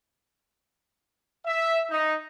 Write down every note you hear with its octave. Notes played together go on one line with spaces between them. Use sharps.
E5
D#4